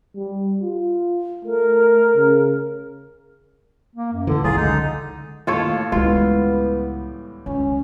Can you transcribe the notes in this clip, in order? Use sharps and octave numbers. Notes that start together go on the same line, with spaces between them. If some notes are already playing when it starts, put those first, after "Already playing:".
G3
F4
A3 A#4
C#3
A#3
F#2
D#2 A2 D3 E3
F#1 B1 A2 F#3 F4 G#4
C#2 D3 D#4
A1 D#2 A2 F4 A4 C#5
C#2 A2 E3 G3 G#3 B3 F4
C#2 C#4